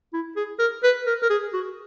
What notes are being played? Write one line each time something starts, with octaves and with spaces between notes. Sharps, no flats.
E4
G#4
A#4
B4
A#4
A#4
G#4
F#4